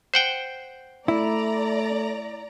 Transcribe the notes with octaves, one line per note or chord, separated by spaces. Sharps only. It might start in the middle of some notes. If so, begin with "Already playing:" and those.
C5 F#5 G5
A3 E4 D5 A#5